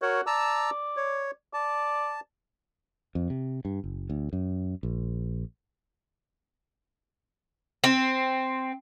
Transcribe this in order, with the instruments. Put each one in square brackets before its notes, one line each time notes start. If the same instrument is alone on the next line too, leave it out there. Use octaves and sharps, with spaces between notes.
[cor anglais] F#4 [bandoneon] A#4 C#5
[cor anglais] D5 [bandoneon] A5 A#5 E6
[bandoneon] C#5
[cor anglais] D5 [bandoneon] A5
[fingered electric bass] F2
C3
G2
F#1
D2
F#2
A#1
[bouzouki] C4